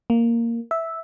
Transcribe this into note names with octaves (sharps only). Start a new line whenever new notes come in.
A#3
E5